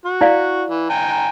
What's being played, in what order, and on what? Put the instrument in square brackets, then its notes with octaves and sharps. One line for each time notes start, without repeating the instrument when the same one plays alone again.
[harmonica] F#4
[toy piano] E4 D5 F5
[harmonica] E3
G5 G#5 A#5